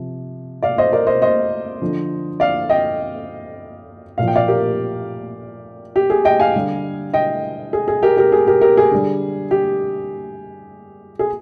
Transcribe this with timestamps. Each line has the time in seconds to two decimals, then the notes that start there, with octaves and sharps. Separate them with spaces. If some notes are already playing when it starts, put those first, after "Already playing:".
Already playing: C3 F3
0.63 D5 F5
0.78 C5 D#5
0.92 A#4 D5
1.07 C5 D#5
1.22 C5 D#5
1.82 D3 F3
2.40 D5 F5
2.69 D#5 G5
4.18 A#2 F3 F5
4.28 G5
4.36 D5 F5
4.48 G4 A#4
5.96 G4
6.10 G#4
6.25 D#5 G5
6.40 F5 G#5
6.55 D3 G3
7.13 D#5 G5
7.73 G#4
7.88 G#4
8.03 G4 A#4
8.17 G4 A#4
8.32 G#4
8.47 G4 A#4
8.61 G4 A#4
8.77 G#4
8.91 D3 G3
9.51 G4
11.19 G#4